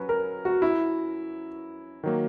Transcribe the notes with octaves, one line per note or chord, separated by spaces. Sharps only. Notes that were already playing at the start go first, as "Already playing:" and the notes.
Already playing: F#3 C#4 B4
A#4
F#4
E4
D#3 F#3 A#3